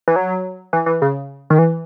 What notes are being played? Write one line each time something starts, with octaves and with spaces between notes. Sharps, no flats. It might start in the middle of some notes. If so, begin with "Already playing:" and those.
E3
F#3
E3
E3
C#3
D#3
E3